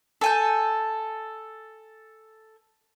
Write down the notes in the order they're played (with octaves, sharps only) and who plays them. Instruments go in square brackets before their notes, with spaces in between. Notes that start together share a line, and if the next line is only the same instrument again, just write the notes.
[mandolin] A4 G#5 G6